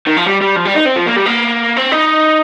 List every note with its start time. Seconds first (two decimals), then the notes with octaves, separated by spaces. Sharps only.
0.07 D#3
0.17 F3
0.26 G3
0.41 G3
0.56 F3
0.65 G3
0.75 D#4
0.85 C4
0.96 F3
1.06 A#3
1.16 G3
1.26 A#3
1.77 C4
1.92 D#4